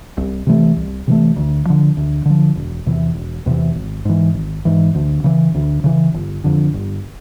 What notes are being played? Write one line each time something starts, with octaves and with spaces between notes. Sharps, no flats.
C2
C3 E3 A3
C2
C3 E3 A3
D2
D3 F3
D2
D3 F3
E1
E2 C3 E3
E1
E2 C3 E3
G#1
G#2 E3
G#1
G#2 E3
D2
C#3 E3
D2
C#3 E3
G1
F2 D3
G1